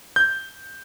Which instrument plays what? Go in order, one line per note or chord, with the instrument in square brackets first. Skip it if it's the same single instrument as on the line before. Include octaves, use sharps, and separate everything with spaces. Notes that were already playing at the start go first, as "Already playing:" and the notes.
[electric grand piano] G6